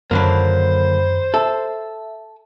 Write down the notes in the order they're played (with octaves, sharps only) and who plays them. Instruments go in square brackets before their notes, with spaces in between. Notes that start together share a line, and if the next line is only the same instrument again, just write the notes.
[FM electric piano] F#2 D#3 B5 [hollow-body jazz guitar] D3 F#3 A#3 [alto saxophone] C5
[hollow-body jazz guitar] A4 [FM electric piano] E5